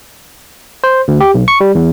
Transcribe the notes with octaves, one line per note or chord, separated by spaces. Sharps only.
C5
D2
G4
B1
C#6
G3
E2